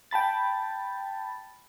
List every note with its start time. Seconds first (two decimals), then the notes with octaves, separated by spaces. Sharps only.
0.11 G5 A5 B5 A6